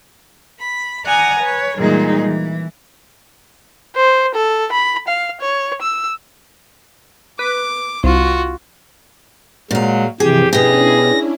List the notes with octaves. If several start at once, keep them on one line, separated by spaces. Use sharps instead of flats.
B5
D5 F#5 G#5 A#5 D#6
B4 C#5
A#2 E3 G3 G#3 D#4 G#4
E3
C5
A4
B5
F5
C#5
E6
B4 D6
C2 F4 F#4
A#2 F#3 G#3 F5
G2 C3 E3 F3 G4 G#4
B2 C#4 D4 E4 G4 G#4 A#6